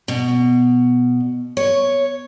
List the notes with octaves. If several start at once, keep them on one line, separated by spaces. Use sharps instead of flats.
B2
C#5